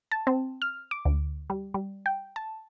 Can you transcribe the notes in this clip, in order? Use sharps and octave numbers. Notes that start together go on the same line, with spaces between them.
A5
C4
F6
D6
D2
G3
G3
G5
A5